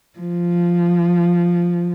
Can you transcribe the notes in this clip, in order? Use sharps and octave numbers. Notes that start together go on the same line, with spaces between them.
F3